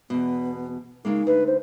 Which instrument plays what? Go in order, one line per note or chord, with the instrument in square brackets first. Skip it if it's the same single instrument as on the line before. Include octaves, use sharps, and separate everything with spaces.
[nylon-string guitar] E2 B2 [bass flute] B3
[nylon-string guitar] C#3 G#3 A#3 [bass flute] D#4
[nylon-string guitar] D2 [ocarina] B4
[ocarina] C5